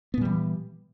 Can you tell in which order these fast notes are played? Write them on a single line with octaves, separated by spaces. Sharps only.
B3 A#2 G3 E3